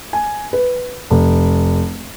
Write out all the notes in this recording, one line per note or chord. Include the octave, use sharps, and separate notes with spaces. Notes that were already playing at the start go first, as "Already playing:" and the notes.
G#5
B4
F1